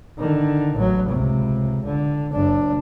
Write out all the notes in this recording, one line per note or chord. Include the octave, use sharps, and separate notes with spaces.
D3 D#3
A1 F#3
C#2 C3
D3
F#1 D4